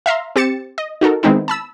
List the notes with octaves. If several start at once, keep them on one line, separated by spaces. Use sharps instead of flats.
E5 F5 A#5 C6
C4 G4 A6 C#7 E7
D#5
D#4 F#4 A4 A#4
D#3 G#3 B3 C4 D#4 E4
A5 B5 E6